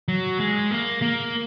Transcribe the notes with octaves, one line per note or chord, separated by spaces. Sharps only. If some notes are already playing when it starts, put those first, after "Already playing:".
F#3
G#3
A#3
A#3